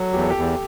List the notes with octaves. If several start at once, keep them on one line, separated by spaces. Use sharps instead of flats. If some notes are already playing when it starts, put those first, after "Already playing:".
Already playing: F#3 A4
E2 G4
A4
G4
E2